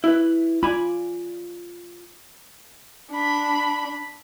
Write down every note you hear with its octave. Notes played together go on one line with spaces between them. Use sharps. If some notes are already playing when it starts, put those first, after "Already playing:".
E4 B4
F4 D5 G#5 B5
D4 B5